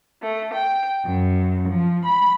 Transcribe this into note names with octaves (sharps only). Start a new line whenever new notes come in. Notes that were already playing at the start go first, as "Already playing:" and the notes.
A3
G5
F#2
F3
B5